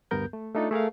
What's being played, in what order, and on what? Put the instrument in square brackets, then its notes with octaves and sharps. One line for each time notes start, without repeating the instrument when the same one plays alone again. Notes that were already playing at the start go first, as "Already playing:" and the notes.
[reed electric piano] D2 G2 B3 A#4 G6
A3
A3 D4 D#4 F4 A4
A3 G#4 A#4 F5